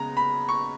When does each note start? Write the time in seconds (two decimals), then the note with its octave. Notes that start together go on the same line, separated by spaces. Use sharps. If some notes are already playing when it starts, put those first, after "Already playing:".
Already playing: C#3 G#3 B3 A#5
0.17 B5
0.49 C#6